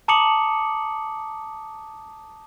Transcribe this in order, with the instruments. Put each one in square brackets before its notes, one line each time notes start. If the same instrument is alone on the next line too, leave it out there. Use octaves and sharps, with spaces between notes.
[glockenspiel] A5 A#5 D6 D#6 C#7 F#7